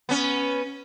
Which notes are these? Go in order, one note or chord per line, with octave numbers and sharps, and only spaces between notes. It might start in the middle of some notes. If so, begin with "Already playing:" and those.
B3 C#4